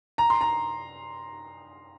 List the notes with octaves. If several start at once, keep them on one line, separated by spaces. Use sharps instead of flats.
A#5
C6
A#5